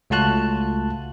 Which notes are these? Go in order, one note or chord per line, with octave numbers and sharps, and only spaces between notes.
C#2 A3 F4 F#4 A5 F#6